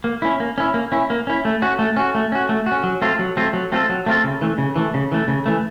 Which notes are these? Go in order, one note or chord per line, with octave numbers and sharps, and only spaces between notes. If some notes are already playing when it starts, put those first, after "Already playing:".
A#3
C#4 E4
A#3
C#4 E4
A#3
C#4 E4
A#3
C#4 E4
A3
C#4 F#4
A3
C#4 F#4
A3
C#4 F#4
A3
F#4
C#4
F#3
A3 C4 F4 A4
F#3
A3 C4 F4 A4
F#3
A3 C4 F4 A4
F#3
A3 C4 F4 A4
C#3
E3 A3
C#3
E3 A3
C#3
E3 A3
C#3
E3 A3